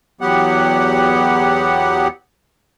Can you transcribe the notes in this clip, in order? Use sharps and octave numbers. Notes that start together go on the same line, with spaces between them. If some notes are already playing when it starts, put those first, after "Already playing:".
E2 F#3 B3 G4 F#5